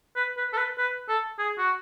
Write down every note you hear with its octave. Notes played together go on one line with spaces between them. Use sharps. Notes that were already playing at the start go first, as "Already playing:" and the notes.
B4
B4
A4
B4
B4
A4
G#4
F#4